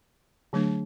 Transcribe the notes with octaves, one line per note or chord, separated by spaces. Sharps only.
D3 F#3 A3 D4